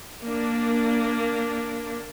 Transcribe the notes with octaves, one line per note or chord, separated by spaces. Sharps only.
A#3 D4